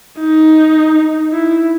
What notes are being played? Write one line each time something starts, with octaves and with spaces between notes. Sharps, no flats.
D#4
E4